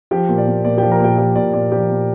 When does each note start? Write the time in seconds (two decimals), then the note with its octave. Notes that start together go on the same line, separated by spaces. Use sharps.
0.11 F3 G4 G5
0.29 A#2
0.38 D5
0.47 A#2
0.65 A#2 D5
0.78 F3 G4 G5
0.92 A#4 A#5
1.00 A#2 G4 G5
1.18 F3 G4 G5
1.35 A#2 D5
1.53 A#2 D5
1.72 F3 G4 G5
1.90 A#2